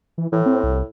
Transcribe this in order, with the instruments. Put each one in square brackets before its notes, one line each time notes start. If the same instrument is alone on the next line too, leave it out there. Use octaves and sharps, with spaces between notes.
[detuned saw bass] E3
[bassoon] A2 [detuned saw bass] E3
[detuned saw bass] C4
C2